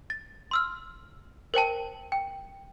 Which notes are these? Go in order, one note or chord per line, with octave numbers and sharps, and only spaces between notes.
A6
C6 E6 F6
A#4 C5 G5 A5
G5